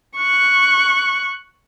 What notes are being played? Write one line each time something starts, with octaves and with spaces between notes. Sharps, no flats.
C#6 F#6